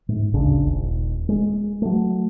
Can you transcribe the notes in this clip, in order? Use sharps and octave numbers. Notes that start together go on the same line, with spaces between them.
G#2
D1 G#1 C#3 D4
D#1
G#3
F#3 A3